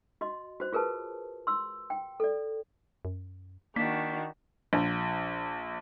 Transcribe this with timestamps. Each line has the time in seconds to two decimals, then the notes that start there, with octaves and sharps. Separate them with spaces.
0.21 F#4 D#5 C6
0.60 F#4 C5
0.73 F4 G#4 A#4 B4 A5
1.47 C6 E6
1.90 G5
2.20 A4 D5
3.05 F#2
3.76 D#3 A#3 D4 F#4 B6
4.73 A#1